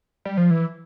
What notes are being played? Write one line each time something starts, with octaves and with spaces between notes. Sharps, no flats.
G3
F3
E3